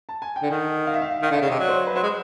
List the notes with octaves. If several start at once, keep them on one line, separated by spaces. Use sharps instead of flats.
A5
G#5
G5
D3
D#3 F#5
F5
E5
F5
D#3 F5
D3
E5
C#3
D#5
C3
F#3 D5
C5
B4
F#3 C5
G#3